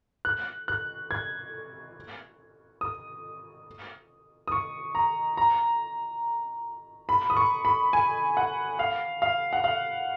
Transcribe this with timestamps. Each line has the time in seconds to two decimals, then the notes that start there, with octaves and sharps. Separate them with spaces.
0.25 F#6
0.68 F#6
1.11 G#6
2.81 D#6
4.48 D#6
4.52 C#6
4.95 A#5
5.37 A#5
7.09 B5
7.30 D#6
7.37 C#6
7.65 B5
7.93 G#5
8.37 F#5
8.79 F5
9.22 F5
9.53 F#5
9.64 F5